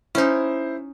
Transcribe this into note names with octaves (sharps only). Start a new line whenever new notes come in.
C#4 D#4 E4 C5